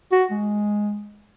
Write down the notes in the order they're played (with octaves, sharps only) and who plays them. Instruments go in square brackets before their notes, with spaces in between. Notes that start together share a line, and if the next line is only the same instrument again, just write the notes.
[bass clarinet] F#4
G#3